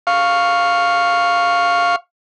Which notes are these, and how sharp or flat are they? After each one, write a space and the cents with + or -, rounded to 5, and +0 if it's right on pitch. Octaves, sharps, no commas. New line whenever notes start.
F5 +0 C#6 +0